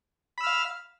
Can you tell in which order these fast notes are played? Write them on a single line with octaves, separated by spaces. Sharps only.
B5 E6 F6 F5